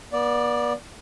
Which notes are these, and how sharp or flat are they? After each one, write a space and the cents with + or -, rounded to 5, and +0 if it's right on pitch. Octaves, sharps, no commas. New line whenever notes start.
B3 -40 D5 +0